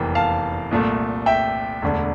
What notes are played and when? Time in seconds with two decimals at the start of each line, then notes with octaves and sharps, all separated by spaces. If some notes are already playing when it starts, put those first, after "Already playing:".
Already playing: F1 E2 E3 A#3 G5
0.15 F5 A5
0.71 C2 A#2 A3
1.26 E5 G5
1.82 E1 D2 D3